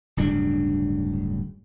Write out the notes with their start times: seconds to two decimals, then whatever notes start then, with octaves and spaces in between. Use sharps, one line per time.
0.17 D1 G2 C#3 D4